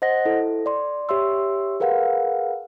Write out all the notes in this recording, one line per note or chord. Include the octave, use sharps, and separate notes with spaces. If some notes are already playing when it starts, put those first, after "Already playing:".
C5 D#5 F#5 A#6
E4 A4
D5 C6
G4 C#5 E5 C6 E6
G#4 A#4 B4 F5 F#5